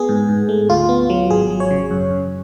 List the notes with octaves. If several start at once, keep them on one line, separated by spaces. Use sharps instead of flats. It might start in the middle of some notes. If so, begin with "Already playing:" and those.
Already playing: B3 G#4
G#2
G#2
A3
D2 F4
B3
F#3
G#1 G#4
F#3
C#5
C#3
F#2
F#2